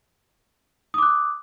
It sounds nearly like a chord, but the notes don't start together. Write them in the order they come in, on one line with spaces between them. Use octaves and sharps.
D#6 D6 F#6